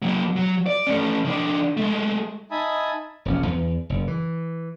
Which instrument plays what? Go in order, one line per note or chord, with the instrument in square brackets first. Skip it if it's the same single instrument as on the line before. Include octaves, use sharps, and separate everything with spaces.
[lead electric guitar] F#3 A#3
F#3
D5
A3 C#4
D#3 D4
G#3 A3
[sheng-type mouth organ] D#4 E5 G#5 A5 B5 D#6
[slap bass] E1 A#1 C#4
E2
F#1
E3